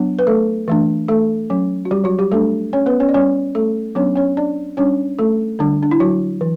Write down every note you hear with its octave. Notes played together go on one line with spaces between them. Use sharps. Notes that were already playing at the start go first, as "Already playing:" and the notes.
Already playing: F#3 B3 D4
B4
A3 A4
E3 A3 D4
A3 A4
F#3 C#4
F#4
G3 G4
F#3 F#4
G3 G4
G3 A3 D4 A4
C#4 C#5
B3 B4
C#4 C#5
D5
G3 C#4 C#5
A3 A4
F#3 B3 C#4 D4 C#5
C#4 C#5
D4 D5
G3 C#4 D4 C#5
A3 A4
D3 G3 D4
D4
E4
F#3 F#4
E3